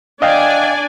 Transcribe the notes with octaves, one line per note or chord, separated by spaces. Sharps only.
D4 D5 D#5 F5 G5 G#5